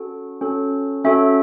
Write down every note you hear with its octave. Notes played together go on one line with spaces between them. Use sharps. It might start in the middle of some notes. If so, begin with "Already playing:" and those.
Already playing: C#4 F#4 A4
C#4 F#4 A4
C#4 F#4 A4 E5